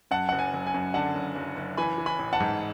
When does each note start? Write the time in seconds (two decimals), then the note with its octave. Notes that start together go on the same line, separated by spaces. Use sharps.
0.11 F#2 F#5 A5
0.29 F#1 F#5
0.39 G#5
0.54 F#1
0.67 G#5
0.74 F#2
0.94 D3 F#5 A5
1.15 F#1
1.36 F#1
1.57 F#1
1.77 E3 G#5 B5
1.98 E3
2.06 G#5 B5
2.19 A1
2.33 F#5 A5
2.40 G#2